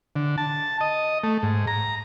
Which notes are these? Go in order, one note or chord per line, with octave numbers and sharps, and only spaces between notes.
D3
A5
D#5
A3
G#2
A#5